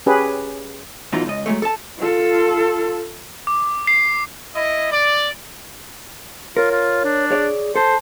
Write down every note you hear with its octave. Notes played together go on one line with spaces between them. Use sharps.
C#4 G4 G#4 B4
F#2 B2 E3 F#3 D#4 F4
C#2 D#5
F#3 G#3 A3
A4 A5
F4 A4
D6
C7
E4 D#5
D5
F4 A#4 C#5
F4
D4
G#4 C#5 D5
A4 C5 A5